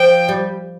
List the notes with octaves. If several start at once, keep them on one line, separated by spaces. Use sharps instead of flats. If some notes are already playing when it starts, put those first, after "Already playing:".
Already playing: F3 G5
G3